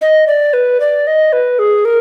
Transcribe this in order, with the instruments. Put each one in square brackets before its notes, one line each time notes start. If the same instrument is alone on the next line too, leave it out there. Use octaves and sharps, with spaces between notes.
[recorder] D#5
D5
B4
D5
D#5
B4
G#4
A#4